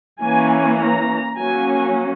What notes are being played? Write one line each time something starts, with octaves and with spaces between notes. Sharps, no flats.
E3 A#3 C#4 G#5
A#5
F#3 A#3 C#4 G#5